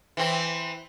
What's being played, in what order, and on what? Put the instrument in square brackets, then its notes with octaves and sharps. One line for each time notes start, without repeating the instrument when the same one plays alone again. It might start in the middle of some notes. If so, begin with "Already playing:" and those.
[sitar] E3 C4